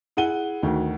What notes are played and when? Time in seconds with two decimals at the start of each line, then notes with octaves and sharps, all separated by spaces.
0.17 E4 G#4 F#5 D#7 G7
0.63 D2 D#3 F#4